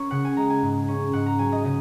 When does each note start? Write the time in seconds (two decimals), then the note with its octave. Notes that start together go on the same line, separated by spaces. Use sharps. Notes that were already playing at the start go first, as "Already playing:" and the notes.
Already playing: C#4 A#4 C#5
0.11 C#3 F#5
0.25 G#5
0.37 G#3 A#5
0.50 G#5
0.62 G#2
0.88 C#4
1.13 G#2 F#5
1.26 A#5
1.39 F#3 G#5
1.52 D#5
1.65 C#3 D#5